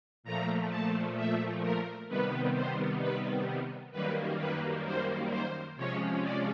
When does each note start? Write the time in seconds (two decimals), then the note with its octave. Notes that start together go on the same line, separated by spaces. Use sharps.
0.23 A#2 F3 A3 A#5
0.69 A5
1.16 E5
1.61 A#4
2.08 C3 D#3 G3 B3 B4
2.54 C5
3.00 B4
3.92 F#2 D#3 G3 A#3 B4
4.39 B4
4.85 C5
5.30 C5
5.76 C3 F3 G#3 C#4 C#5
6.22 D5